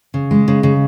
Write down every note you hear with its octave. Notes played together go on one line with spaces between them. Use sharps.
C#3
G#3
C#3
C#3